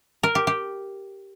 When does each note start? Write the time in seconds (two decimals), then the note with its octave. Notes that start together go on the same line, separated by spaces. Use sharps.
0.23 A#4
0.35 G4
0.47 G4